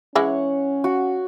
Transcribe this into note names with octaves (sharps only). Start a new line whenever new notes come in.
E3 G#3 C#4 E4 C#5 F#5
F#4